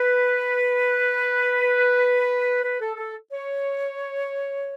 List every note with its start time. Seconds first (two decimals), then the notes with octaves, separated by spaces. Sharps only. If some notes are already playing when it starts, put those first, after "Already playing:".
Already playing: B4
2.63 B4
2.80 A4
2.97 A4
3.32 C#5